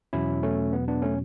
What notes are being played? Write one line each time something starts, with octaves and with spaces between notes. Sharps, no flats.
E2 B2 F#3 C#4 E4
A3 C#4
B3
B3 D4
A3 C#4